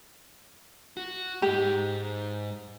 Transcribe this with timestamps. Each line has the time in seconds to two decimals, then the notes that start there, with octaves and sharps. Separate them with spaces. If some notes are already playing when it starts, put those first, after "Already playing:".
0.97 F#4
1.42 G#2 G#3 G4